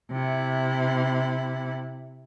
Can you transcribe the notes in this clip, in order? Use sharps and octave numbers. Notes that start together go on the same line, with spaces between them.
C3 E4